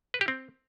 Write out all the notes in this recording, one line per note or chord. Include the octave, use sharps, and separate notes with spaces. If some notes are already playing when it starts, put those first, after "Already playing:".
B4
G4
C4